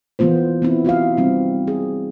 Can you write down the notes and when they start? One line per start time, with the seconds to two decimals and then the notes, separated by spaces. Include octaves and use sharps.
0.19 E3 A#3 B3 F4 C5
0.62 B3 C4 E4
0.85 F4 F#4 E5 F5
1.17 G3 C4 D#4
1.67 G#4